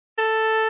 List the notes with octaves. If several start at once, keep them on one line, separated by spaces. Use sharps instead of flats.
A4